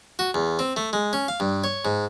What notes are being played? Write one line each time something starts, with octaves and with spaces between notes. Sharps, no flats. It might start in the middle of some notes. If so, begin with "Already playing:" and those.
F#4
E2
C4
A3
G#3
C#4
F5
G2
C#5
G#2